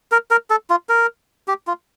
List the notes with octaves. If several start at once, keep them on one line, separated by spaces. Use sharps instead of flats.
A#4
A#4
A4
F4
A#4
G4
F4